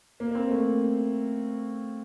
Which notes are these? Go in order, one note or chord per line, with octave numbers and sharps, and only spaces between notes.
A#3
A#3
C4
A3